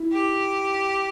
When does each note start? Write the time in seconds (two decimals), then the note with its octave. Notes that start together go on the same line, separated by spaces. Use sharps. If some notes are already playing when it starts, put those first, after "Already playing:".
Already playing: E4
0.13 G4